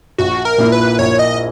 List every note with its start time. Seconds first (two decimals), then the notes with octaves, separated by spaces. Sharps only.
0.18 A#1 F#4
0.45 A#4
0.58 A#2 A#3 E4
0.72 B4
0.99 A#1 C#5
1.19 D#5